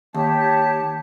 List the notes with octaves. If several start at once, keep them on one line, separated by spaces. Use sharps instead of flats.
D#2 G4 C#5 A5